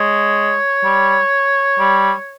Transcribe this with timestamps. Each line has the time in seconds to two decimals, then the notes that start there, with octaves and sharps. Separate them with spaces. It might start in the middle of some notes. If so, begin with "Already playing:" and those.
Already playing: G#3 C#5
0.84 G3
1.79 G3